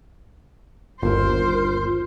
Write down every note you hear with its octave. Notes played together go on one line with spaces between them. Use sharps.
G1 D#2 F4 A#4 C5